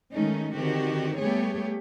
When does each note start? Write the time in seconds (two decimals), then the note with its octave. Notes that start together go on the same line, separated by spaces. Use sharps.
0.13 D#3 G#3 A3 C#4 D#4
0.55 D3 D#3 C4 F#4 G4
1.19 G3 A3 B3 G4 G#4 C#5